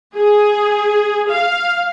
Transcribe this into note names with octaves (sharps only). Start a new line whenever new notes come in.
G#4
F5